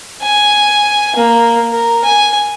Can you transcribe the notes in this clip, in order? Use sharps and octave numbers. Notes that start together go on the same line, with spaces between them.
G#5
A#3
A#4
G#5